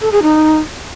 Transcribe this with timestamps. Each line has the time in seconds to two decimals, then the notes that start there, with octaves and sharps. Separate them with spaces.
0.01 A4
0.12 G#4
0.22 D#4